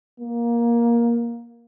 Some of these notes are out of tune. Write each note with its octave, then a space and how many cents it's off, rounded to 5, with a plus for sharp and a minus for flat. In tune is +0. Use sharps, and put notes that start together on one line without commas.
A#3 +15